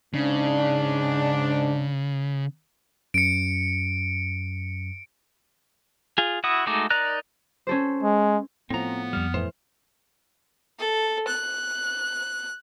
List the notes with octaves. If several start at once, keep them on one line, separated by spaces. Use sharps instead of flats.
G#2 C#3 D4
F#2 C#7 D7
F4 G#4
E4 F#4 F#5 D#6
G#3 A3 D#4 F#4 D6
D#4 A#4 D5 A#5 F#6
C#4 A4 C5
G#3
A2 F3 B3 C4 A#5
F2 G3 F6
A2 E3 C5
A4
F#6